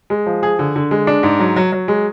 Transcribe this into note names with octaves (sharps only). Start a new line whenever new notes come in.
G#3
F3
G#4
D3
D3
G#3
D4
G#2
F#3
F#3
F#3
G#3